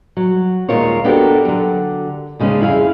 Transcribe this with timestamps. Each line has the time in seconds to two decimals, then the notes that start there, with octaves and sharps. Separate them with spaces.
0.17 F#3
0.69 D#2 A#2 G#3 F4 A#4 C#5
1.04 B3 D4 F#4 G4 A4 A#4
1.45 D3 F#3
2.39 D#2 C#3 G#3 A#3 C#4 D4
2.61 F2 E4 G#4 F5